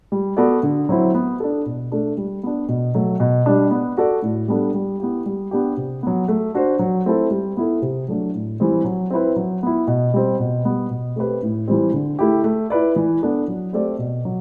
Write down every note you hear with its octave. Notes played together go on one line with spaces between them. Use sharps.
G3
B3 F#4 A4 D5
D3
F#3 C4 E4
B3
D4 A4
B2
A3 D4 A4
G3
B3 D4
B2
F#3 A3
B2
G3 D4
B3
F#4 A4 D5
A2
G3 B3 D4 A4
G3
B3 E4 G4
G3
B3 D4 G4
C3
F#3 B3
A3
D4 F#4 C5
F#3
A3 C4 E4 A4
G3
B3 E4 A4
C3
F#3 A3 D4
A2
E3 G3 C4
F#3
C4 E4 B4
F#3
B3 E4
B2
G3 C4
B2
G3 B3
B2
A3 C4 G4 B4
A2
E3 G3 C4
D3
A3 E4 G4
A3
E4 B4 D5
E3
B3 D4 A4
F#3
A3 C4 G4 D5
B2
F#3